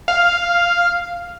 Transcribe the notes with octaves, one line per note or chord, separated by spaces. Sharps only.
F5